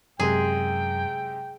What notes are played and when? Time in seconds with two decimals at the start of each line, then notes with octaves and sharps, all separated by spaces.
0.20 F#2 C3 G#3 G#4 G5 C6